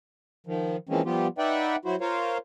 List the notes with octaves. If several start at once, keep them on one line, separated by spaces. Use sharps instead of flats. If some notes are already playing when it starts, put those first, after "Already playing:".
D#3 F3
E3 F3 G#3 A#3 C4 C#4
F3 G3 B3 F4 G4
D#4 B4 D5 E5 F#5 G5
F#3 E4 F#4 C5
F4 A#4 C5 C#5 F5